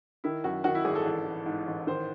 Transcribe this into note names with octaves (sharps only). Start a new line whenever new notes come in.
D#3 E4
F#2 F#4
D#3 F#4
E4
G#1 G#4
A4
A1
E3
G#2
A1
D#3 C5